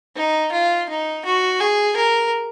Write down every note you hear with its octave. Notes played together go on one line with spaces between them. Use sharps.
D#4
F4
D#4
F#4
G#4
A#4